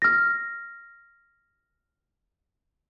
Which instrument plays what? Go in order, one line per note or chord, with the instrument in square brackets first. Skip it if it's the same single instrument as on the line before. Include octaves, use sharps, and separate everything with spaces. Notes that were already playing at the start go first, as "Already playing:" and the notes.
[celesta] F6 A#6